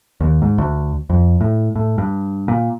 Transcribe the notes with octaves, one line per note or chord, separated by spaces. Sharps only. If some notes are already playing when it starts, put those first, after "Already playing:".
D#2
G#2
D2
F2
A2
A2
G2
A#2